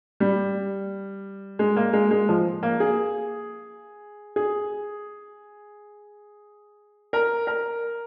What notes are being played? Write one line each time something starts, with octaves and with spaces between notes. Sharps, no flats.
G3
G#3
A#3
G#3
G#3
F3
A#3
G#4
G#4
A#4
A#4